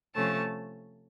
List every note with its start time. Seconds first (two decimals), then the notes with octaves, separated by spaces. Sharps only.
0.14 C3 F3 A3 C#4 A5